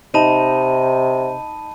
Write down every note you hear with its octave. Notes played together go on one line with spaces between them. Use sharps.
C3 D#4 A5 B5 D#7